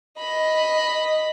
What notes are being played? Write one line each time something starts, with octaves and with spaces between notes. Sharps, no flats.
D#5 B5